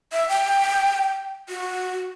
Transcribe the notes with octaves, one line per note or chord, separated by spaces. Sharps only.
E5
G5
F#4